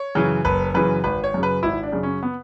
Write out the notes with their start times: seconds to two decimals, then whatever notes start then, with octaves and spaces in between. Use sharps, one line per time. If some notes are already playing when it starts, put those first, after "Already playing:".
Already playing: C#5
0.15 F#2 C#3 E3
0.45 F#1 B4
0.74 F#2 C#3 E3 B4
1.04 G#1 B4
1.24 C#5
1.34 F#2 C#3
1.43 B4
1.63 G#1 E4
1.83 D4
1.92 F#2 C#3
2.03 C#4
2.23 B3